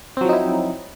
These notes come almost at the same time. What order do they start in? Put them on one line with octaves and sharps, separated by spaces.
C4 F#3 F3 D#4 E4